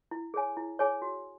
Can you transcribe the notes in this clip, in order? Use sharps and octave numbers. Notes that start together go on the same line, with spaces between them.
E4
G#4 C#5 G#5
E4
G#4 C#5 G#5
F#4